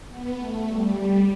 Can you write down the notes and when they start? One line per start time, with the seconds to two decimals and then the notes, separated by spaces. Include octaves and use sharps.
0.08 B3
0.38 A3
0.67 G3